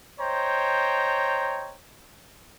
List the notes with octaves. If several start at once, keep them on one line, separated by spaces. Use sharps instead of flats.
C5 C#5 D#5 G5 A#5